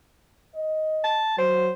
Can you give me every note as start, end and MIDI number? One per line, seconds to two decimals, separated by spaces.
0.55 1.19 75
1.04 1.33 81
1.38 1.69 54
1.38 1.71 72